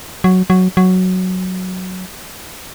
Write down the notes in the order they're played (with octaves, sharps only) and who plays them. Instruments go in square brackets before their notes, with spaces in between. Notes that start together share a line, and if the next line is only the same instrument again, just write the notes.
[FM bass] F#3
F#3
F#3